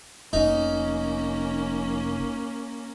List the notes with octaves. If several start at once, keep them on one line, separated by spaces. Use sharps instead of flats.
F1 A#3 C#4 D#4